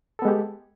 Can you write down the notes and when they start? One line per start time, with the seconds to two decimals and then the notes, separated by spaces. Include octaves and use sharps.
0.19 A4
0.22 B3
0.25 G#3
0.28 G4